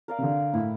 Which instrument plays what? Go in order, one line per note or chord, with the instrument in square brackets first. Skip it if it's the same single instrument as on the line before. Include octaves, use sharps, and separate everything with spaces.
[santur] A#4 D5 F5
[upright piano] C3
D3
[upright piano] A2 [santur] E4